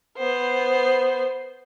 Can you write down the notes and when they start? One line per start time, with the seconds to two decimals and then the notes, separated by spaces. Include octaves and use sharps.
0.18 B3 C5